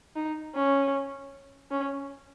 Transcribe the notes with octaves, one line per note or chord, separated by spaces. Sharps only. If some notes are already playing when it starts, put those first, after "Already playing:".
D#4
C#4
C#4